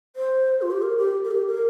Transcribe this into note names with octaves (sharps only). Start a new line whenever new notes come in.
C5
F4
G4
A#4
G4
A#4
G4
A#4